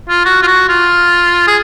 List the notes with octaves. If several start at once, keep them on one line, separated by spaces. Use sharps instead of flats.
F4
F#4
F4
F#4
F4
G#4